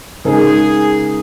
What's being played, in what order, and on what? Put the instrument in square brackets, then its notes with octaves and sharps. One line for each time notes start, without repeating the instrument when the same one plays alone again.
[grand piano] C#3 G#3 D#4 A#4 [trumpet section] G#4